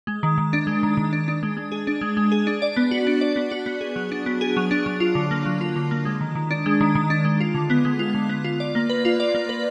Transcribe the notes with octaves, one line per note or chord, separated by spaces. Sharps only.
G#3
D#3
D#3
D4
G#3
D#3
D#3
D4
D4
G#3
G#3
G#4
D4
G#3
G#3
G#4
D4
D5
B3
F#4
D4
D5
B3
F#4
B3
G#4
F#3
D4
B3
G#4
F#3
D4
F#3
F4
D3
A#3
F#3
F4
D3
A#3
G#3
D#3
D#3
D4
G#3
D#3
D#3
D4
G#3
F4
D3
B3
G#3
F4
D3
B3
F4
D5
A#3
B4
F4
D5
A#3
B4